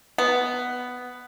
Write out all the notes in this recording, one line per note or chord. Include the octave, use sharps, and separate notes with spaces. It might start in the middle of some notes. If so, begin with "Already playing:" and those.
B3